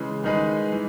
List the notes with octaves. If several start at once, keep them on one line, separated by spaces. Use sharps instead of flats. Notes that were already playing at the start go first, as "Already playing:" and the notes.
Already playing: C#3 E3 G#3
D#3 G#3 D#4 G#4 B4
E3